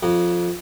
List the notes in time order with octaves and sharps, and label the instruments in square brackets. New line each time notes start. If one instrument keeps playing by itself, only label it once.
[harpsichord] F2